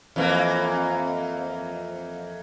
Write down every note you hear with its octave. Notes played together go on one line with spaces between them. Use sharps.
F2 E3 A#3